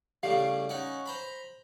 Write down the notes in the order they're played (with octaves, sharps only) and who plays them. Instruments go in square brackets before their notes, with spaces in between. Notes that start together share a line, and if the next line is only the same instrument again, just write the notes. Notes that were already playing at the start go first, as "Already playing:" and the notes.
[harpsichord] A2 C#3 G3 [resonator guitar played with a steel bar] F5
[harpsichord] C#4 D#4 F#5
C5 A#5 B5